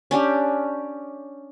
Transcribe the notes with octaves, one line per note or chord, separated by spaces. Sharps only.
C#4 D4 G4